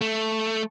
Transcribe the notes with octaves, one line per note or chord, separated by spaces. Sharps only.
A3